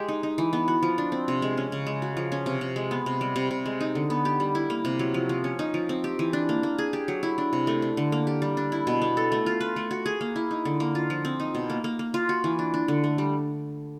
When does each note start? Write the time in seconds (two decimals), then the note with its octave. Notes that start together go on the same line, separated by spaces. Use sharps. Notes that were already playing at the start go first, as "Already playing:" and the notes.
Already playing: G#3 G4
0.08 D#4
0.23 D#4
0.38 E3
0.53 B3
0.68 F#4
0.83 F3
0.98 D4
1.12 C4
1.28 C3
1.42 G#3
1.58 C#4
1.72 C#3
1.86 G#3
2.02 F#4
2.17 F3
2.32 C#4
2.46 C3
2.61 C3
2.76 G#3
2.91 B3
3.06 C3
3.21 G3
3.36 C3
3.51 C3
3.66 G#3
3.81 D#4
3.95 D3
4.10 B3
4.25 G4
4.40 G3
4.55 E4
4.70 A#3
4.85 C3
4.99 F#3
5.14 F3
5.29 F3
5.44 C#4
5.59 D#4
5.74 F3
5.89 C4
6.04 G4
6.19 E3
6.33 D4
6.49 A#3
6.63 A#3
6.78 G#4
6.93 G4
7.08 F#3
7.23 E4
7.38 D4
7.53 C3
7.67 A3
7.82 D4
7.97 D3
8.12 A#3
8.27 G4
8.42 G3
8.57 D4
8.72 E4
8.87 B2
9.02 B3
9.17 A4
9.32 A3
9.46 F4
9.61 B4
9.76 A3
9.91 F#4
10.06 G#4
10.21 A#3
10.36 E4
10.51 D#4
10.65 D3
10.80 A#3
10.95 F4
11.10 F3
11.25 C4
11.40 D#4
11.55 B2
11.70 A#3
11.84 A#3
11.99 A#3
12.14 F4
12.29 F#4
12.44 E3
12.59 D4
12.74 D4
12.88 D3
13.04 A3
13.18 G3